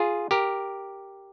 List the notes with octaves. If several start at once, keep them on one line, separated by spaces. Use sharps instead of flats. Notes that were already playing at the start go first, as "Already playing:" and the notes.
Already playing: F4 G#4
G4 A#4